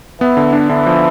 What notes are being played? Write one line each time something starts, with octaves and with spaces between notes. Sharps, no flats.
E3 B3
D3
D4
D3 E3
F3